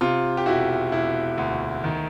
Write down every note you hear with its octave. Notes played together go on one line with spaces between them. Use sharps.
C3 F4
G4
E1 E4 F#4
E1 E4
D2
D#3